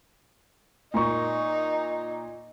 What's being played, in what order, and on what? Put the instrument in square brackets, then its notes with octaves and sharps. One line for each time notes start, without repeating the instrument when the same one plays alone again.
[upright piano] A#2 A#5 C#6 [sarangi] D#4